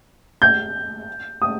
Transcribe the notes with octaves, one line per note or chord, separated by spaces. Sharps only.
G6
D#6